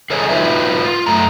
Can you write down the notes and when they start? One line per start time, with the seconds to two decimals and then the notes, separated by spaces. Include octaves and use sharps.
0.10 G#4 A4 C#5 D#5 G#5
0.29 D#4 F4 F#4 B4 E5
0.83 F4
1.06 F#2 A3 A#5